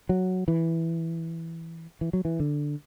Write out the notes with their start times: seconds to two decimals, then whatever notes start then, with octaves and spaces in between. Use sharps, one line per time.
0.09 F#3
0.48 E3
2.01 E3
2.13 F#3
2.25 E3
2.40 D3